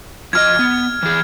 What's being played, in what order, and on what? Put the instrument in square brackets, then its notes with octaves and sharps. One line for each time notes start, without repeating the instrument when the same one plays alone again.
[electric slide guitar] F2 E4 D#5 [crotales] F6 G#6
[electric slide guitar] B3
E3 G#4